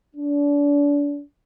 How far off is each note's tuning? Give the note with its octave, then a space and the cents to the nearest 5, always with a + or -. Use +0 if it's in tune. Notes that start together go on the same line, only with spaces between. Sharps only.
D4 -35